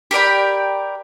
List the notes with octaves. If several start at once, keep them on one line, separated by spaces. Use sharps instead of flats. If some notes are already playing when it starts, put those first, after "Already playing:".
G4 A#4 D5 B5